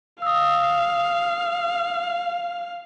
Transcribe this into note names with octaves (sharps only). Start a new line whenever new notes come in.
F5 D#6 E6